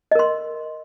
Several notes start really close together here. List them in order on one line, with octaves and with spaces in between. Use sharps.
D#5 A#4 C6